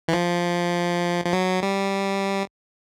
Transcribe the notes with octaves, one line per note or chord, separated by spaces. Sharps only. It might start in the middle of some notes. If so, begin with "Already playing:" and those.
E3
F3
F3
F#3
G3